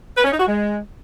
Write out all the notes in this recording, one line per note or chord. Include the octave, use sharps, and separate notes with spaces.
B4
C#4
D#4
F#4
G#3